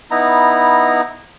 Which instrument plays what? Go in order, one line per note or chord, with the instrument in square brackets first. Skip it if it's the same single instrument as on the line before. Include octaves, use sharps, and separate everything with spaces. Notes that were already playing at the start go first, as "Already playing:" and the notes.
[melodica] B3 D#4 E4 A#5